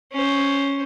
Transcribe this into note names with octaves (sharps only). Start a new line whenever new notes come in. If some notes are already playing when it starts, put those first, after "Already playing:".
C#4 C5